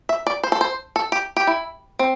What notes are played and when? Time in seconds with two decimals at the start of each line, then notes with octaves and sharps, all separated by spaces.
0.09 E5
0.27 D5
0.43 C5
0.52 A4
0.61 C5
0.96 A4
1.12 G4
1.37 G4
1.47 E4
1.99 C4